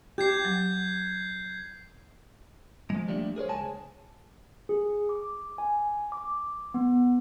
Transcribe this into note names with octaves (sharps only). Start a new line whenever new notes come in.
G4 G6 G#6 C7
F#3
F3 G#3
F3 G3 A3 A#3 D4
G#4 A#4 C5 C#5
C#2 G#3 G#4 G#5 A5
G#4
D6
G#5
D6
B3